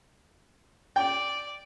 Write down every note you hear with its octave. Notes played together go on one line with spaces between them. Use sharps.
D5 G5